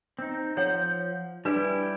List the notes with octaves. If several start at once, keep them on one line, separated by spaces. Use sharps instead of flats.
C4 D#4
F3 C#5 F#5 G6
G3 D4 E4 G4 B4